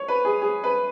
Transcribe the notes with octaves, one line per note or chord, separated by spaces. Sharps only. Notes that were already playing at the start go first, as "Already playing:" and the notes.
Already playing: C#5
B4
G#4
G#4
B4